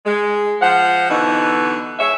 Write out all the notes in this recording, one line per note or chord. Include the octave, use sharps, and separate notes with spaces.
G#3
F3 F#5
B2 D3 E3 D#4
G#3 C#5 E5